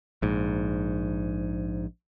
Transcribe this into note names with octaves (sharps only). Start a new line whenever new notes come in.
A#1 G#2